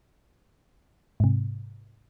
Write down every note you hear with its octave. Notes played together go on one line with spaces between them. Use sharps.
G#2 C3